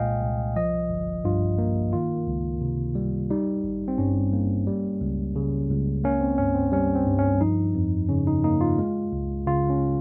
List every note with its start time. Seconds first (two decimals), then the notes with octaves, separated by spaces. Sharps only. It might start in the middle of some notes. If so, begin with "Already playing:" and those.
Already playing: C2 A#2 G#3 D#5 F5 G5 G#5
0.21 C2
0.56 F3 D#5
0.90 G1
1.24 G2 F4
1.58 A#3
1.93 D#3 F4
2.27 C#2
2.61 C3
2.95 G3
3.30 G3 D#4
3.64 G#1
3.88 C4
3.98 G2 C#4
4.33 A#3
4.67 G3
5.01 C#2
5.36 C#3
5.70 C#2
6.04 A#3 C#4
6.21 C4
6.38 G2 C#4
6.55 C4
6.72 G3 C#4
6.95 C4
7.06 G2
7.19 C#4
7.41 F3 D#4
7.75 F2
8.09 C#3 C#4
8.27 D#4
8.44 A#3 D#4
8.61 F4
8.79 G#3
9.12 C#2
9.46 C#3 F4
9.70 C#4